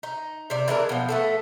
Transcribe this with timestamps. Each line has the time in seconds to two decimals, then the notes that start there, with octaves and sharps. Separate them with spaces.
0.03 D#4
0.50 C3 D5
0.68 E3 G#3 D4 A#4
0.89 B2 F3
1.09 A3 B3 A4